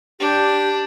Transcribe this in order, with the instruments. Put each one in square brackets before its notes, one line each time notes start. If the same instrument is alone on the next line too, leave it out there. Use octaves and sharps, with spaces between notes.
[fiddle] D4 [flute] G4